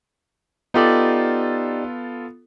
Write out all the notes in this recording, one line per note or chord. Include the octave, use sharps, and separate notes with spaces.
B3 D#4 F4 G4 A4 D5